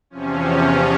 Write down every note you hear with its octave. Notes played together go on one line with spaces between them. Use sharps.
E2 C3 F3 C#4